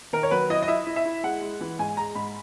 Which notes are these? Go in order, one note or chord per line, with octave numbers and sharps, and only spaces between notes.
D#3 A#4
C#5
F#3 B4
E4 D#5
D#5
E4 E5
E4
E5
E4
G#3 F#5
G#3
E3
G#2 G#5
G#3 A#5
G#2 B5